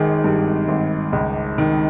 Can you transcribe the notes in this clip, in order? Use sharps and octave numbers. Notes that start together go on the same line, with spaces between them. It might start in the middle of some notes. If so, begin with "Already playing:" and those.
Already playing: G#1 D#3 G#4
G2
G#1
C#2
D#3